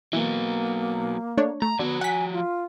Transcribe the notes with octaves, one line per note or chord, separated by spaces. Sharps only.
E3 F#3 A#3 B3
A3 D4 C#5
A3 A#5
D3 F3 B3 F#4
F#5 G#5 B6
F4